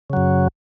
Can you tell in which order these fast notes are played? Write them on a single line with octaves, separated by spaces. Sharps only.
C#3 F#3 F#2